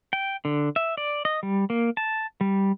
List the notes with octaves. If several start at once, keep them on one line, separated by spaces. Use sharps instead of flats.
G5
D3
E5
D5
D#5
G3
A#3
A5
G3